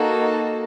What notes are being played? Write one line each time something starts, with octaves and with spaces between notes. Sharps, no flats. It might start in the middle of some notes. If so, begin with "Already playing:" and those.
Already playing: A#3 D#4 F#4 A4
A5